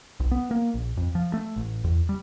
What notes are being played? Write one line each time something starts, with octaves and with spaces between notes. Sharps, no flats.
B1
B3
A#3
A#1
F2
F3
A3
A1
E2
G3